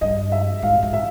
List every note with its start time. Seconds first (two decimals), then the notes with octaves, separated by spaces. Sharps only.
0.01 G2 D#5
0.32 E5
0.62 G#2 F5
0.83 G#2
0.93 E5